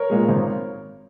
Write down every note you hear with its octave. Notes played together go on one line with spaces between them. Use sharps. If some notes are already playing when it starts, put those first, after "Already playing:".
Already playing: A#4 C#5
A#2 G#3
G#1